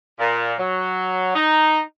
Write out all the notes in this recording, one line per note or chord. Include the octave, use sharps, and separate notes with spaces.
A#2
F#3
D#4